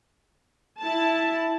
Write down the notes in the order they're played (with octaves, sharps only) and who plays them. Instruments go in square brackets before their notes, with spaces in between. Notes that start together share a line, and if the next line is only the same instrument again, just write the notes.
[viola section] E4 A5